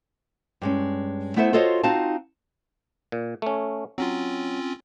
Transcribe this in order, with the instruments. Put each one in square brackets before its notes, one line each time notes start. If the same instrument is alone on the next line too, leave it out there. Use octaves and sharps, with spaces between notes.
[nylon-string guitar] G2 G#3 C#4
A3 B3 E4 A4 C5 E5
F4 F#4 A4 C5 C#5 D#5
C4 D#4 F4 F#4 F5 A5
[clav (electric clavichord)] A#2
A3 C#4
[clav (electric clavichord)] F#3 [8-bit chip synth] C4 C#4 F4